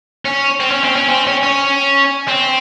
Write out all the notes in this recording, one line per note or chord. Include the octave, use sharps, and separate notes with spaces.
C#4
C4
C#4
C4
C#4
C4
C#4
C#4
C4